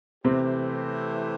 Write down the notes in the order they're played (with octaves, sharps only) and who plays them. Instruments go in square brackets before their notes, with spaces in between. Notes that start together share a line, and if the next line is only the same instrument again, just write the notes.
[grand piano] C3 C4 [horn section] E3 A3 E4 G4 C5